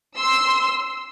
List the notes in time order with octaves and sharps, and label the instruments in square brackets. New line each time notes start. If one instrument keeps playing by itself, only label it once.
[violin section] C6 E6